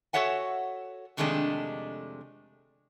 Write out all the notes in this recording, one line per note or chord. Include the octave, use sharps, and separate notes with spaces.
F#4 A4 C#5 E5 F#5 G#5
F2 C3 D#3 G#3 A3 D4